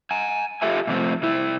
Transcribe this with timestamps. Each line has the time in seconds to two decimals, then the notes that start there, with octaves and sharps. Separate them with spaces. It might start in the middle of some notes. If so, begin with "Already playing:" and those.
0.11 G#5 A#5
0.62 F4 G4 A4 E5 G#5
0.87 G#2 C3 F3 A3 C4
1.22 C3 E4